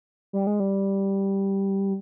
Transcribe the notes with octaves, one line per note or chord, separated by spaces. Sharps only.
G3
G#3
G3